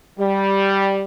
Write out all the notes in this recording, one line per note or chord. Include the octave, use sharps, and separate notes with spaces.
G3